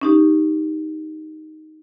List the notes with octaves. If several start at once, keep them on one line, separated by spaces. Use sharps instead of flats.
C#4 D#4 G4